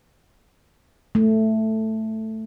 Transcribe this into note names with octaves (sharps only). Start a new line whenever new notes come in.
A3